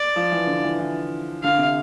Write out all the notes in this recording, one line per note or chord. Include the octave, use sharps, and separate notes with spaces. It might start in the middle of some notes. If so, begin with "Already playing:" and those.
Already playing: D5
F3
E3
D3
E3
E3
D3 F5
C3